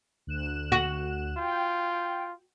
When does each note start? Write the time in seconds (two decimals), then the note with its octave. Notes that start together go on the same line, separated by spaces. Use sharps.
0.27 D2 F#6 E7
0.72 F#4
1.38 F4 G5